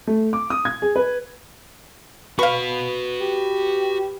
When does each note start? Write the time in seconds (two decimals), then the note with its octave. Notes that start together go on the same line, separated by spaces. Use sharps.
0.07 A3
0.33 D6
0.50 D#6
0.65 G#6
0.82 G#4
0.96 B4
2.39 F#4 B4 F5 B5 C#6
3.20 G4